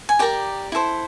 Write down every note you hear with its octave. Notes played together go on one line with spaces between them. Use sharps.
G#5
G4 A#4 D5 G5
E4 A4 C5